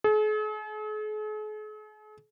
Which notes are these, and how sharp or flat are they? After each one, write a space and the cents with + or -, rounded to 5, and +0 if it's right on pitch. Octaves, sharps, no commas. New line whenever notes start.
G#4 +45